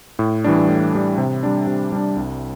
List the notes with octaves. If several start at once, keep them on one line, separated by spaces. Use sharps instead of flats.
A2
E3 G3 D4
A2
E3 G3 D4
C3
G3 D4
C3
G3 D4
C2